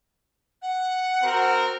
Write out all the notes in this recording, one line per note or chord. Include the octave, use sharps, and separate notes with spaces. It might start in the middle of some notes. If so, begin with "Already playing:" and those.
F#5
C4 F#4 A#4